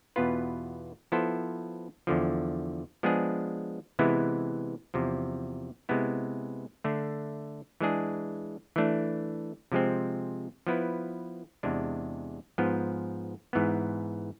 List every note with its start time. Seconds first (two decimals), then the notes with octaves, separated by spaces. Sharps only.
0.16 E2 B2 B3 F4 B4
1.12 F3 B3 E4 A4 C5
2.07 E2 D3 F3
3.03 F3 G#3 B3 D4 G#4
3.99 C3 E3 G#3 B3 E4
4.94 E2 C3 F3
5.89 C3 G#3 B3 E4
6.84 D3 A3 D4
7.81 E3 G#3 D4 G#4
8.76 E3 A3 D4
9.72 C3 F3 G#3 C4
10.67 F3 B3 E4 B4
11.63 E2 C3 G#3 D4
12.58 G#2 F3 B3
13.53 G#2 E3 B3